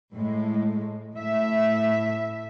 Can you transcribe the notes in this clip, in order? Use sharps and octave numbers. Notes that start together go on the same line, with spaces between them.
A2 G#3
A2 E5